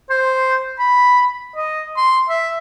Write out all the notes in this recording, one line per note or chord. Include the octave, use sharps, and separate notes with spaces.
C5
B5
D#5
C6
E5